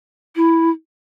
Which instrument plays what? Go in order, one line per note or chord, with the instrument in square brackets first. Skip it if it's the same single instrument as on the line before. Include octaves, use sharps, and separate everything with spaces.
[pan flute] E4